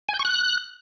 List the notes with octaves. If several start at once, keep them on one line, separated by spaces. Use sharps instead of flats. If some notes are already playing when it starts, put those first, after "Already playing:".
G#5
G6
C#6
F#6